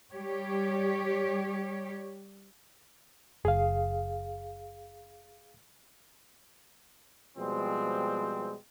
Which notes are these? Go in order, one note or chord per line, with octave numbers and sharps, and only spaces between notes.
G3 G4 C#5
F#1 G#4 F5
B2 F3 G3 G#3 C4